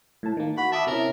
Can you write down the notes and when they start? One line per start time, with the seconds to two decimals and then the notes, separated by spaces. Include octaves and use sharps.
0.23 A2 A5
0.37 D#3 A#3
0.58 F#4 B5
0.72 E5 A5 D6 D#6
0.87 C3 C#4 E4 A#4